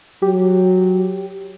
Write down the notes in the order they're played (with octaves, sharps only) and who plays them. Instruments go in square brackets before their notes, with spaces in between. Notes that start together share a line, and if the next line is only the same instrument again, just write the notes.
[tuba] F#3 [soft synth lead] G4